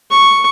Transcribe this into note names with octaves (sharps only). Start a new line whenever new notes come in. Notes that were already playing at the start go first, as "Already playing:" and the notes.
C#6